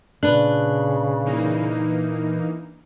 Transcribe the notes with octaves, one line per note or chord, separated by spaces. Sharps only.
A#2 C#3 D4 B4 F#6
E3 A#3 D#4